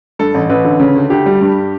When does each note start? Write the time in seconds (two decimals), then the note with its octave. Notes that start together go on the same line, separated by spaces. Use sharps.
0.19 G2 A4
0.34 A1
0.49 A1 B4
0.65 D3
0.80 C#3
0.95 D2
1.10 D2 G4
1.26 G3
1.41 G2